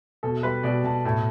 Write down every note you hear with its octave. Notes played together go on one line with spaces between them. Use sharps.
B2 A4
G3 B4
B2 D5
B2 A5
A2 A5